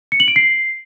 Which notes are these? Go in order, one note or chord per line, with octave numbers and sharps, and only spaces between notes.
C#7
F#7
D7
C7